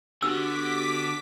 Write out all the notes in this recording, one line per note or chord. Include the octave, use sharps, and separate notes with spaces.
D3 B3 F#4 G4 D6 E6 B6